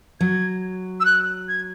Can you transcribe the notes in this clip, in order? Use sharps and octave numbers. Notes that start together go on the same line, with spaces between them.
F#3 G#6
E6
F#6
G#6